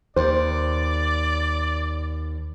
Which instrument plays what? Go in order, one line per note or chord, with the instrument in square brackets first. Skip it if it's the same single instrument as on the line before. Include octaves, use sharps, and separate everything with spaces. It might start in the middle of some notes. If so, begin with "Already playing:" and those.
[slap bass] D#2 [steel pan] C5 [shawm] D5